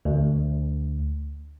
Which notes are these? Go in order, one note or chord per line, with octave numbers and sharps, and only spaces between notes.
D2